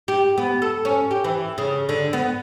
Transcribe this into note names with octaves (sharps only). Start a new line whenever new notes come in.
G4
B3
A4
C#4
G4
E3
C#3
D3
B3